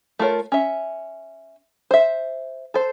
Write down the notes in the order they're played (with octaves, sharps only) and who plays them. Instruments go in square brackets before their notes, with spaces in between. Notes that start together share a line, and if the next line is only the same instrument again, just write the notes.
[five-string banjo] A3 F4 A#4 C#5
C#4 E5
C5 E5
A4 C5